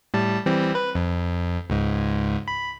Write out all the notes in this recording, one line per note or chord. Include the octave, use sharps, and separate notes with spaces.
A2 G3 A5
E3 G3 C4
B4
F2
C#2 G#2
B5